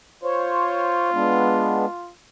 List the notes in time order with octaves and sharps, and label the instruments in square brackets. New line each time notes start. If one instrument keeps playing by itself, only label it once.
[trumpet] F4 [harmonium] C5 C#5
[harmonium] G#3 B3 D4